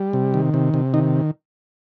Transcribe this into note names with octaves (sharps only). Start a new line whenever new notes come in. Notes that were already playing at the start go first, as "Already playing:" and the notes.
Already playing: G3
C3
D#3
C3
C3
D#3 D#4